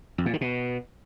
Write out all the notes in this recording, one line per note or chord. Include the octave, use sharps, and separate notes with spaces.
F2
A#2
D#3
B2